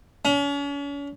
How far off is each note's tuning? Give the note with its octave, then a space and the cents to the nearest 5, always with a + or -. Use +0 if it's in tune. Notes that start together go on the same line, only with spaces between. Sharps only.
C#4 +40